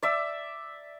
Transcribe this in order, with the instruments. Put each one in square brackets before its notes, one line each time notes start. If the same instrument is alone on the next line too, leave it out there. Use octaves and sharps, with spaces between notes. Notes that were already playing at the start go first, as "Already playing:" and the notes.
[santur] D5 E5 E6